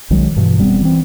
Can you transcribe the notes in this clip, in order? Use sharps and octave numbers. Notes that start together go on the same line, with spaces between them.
B1 D#3 F#3 G#3
G2 B2 E3
F1 G3 B3 C4
E3 C4